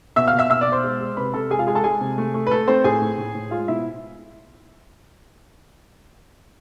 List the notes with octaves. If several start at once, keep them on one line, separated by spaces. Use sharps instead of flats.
B2 E5 E6
F5 F6
B2
E5 E6
B2 E5 E6
D5 D6
B2
C5 C6
G#3
G#3
C3 B4 B5
C3 A4 A5
G#3 G#4 G#5
F4 F5
G#3 G#4 G#5
A4 A5
G#3 G#4 G#5
C3
A3
A3
B4
A3 A4
A3 C4 C5
A2 G#4 G#5
A2
A2
A2
G#3 F4 F5
B2 E4 E5